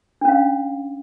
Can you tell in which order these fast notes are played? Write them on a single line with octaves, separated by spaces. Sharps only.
D4 C#4 F5